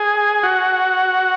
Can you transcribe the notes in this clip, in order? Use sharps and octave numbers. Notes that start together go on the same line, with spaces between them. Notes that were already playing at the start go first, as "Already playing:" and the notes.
Already playing: G#4
F#4